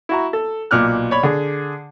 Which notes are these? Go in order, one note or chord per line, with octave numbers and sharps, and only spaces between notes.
E4 F#4 A#5
A4
B1 A#2 D6 F6 F#6
C#5 D5 B5
D3 G#4